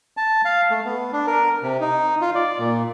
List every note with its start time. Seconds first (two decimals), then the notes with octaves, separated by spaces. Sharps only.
0.17 A5
0.45 F5
0.71 A3
0.85 B3
1.13 D4
1.27 A#4
1.63 C3
1.80 D#4
2.21 F4
2.35 D5
2.59 A#2